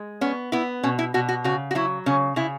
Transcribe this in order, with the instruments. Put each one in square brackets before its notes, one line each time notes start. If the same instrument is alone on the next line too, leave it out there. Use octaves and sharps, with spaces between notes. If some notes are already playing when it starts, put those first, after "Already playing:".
Already playing: [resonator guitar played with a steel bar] G#3
B3 C#4
B3 E4
B2 C#4
E4
B2 F#4
F#4
C#3 F#4
F#4
F#3 E4
C#3 C#4
C#3 E4